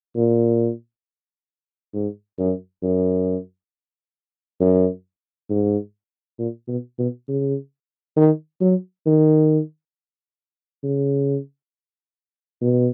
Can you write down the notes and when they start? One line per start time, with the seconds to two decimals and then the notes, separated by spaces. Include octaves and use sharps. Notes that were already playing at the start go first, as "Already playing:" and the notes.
0.16 A#2
1.94 G#2
2.39 F#2
2.83 F#2
4.60 F#2
5.50 G#2
6.39 A#2
6.68 B2
6.99 B2
7.28 C#3
8.17 D#3
8.61 F#3
9.06 D#3
10.84 C#3
12.61 B2